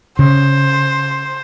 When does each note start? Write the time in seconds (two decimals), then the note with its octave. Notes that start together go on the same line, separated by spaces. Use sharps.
0.19 C#3 C5